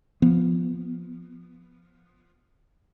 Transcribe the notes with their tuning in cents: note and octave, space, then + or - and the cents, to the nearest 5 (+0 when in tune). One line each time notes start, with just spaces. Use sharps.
F3 +0 B3 +0